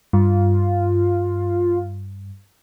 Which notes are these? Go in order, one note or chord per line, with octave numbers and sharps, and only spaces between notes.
G2 F4